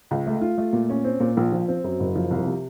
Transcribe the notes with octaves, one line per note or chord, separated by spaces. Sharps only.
C#2
A3
F4
A3
A#2
C#4
C4
A#2
A#1
F3
C4
F#2
F#1
F3
C2
C3